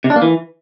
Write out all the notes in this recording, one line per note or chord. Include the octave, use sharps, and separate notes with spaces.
C3
D4
A#3
E3